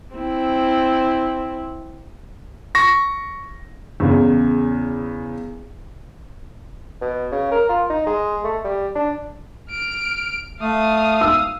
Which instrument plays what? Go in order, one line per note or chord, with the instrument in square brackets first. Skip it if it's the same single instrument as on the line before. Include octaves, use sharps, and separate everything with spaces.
[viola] C4 E4
[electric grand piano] C#6 A#6
[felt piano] E2 C#3
[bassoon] B2
C#3
A#4
F4
D#4
G#3
A3
G3
D4
[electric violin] F6 D7
[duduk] A3 [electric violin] F5 D#6
[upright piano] E6